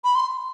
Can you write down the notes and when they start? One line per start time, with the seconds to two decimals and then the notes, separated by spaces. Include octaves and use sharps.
0.04 B5
0.15 C6